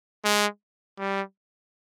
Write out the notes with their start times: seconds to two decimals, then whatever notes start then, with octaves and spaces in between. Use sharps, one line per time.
0.24 G#3
0.99 G3